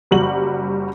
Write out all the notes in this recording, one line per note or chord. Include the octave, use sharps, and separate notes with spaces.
F#1 G3 F#4 F#7